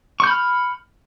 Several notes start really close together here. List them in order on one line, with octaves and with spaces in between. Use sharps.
C#6 G6 B5 F6